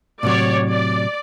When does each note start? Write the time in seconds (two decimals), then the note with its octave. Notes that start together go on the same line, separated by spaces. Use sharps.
0.23 A2 C3 F#3 C#5 D5
0.69 D5